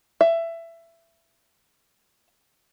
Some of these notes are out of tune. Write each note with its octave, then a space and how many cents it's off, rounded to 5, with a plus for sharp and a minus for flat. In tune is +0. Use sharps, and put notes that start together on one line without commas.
E5 +20